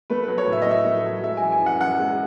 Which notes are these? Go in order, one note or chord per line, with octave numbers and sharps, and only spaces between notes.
A3 B4
F#3 B4
C#5
A2 E5
D#5
A2 E5
A3
F#3
G#3 E5
G#5
E3
G#5
F#2 F#5
F#2 F#5
G#3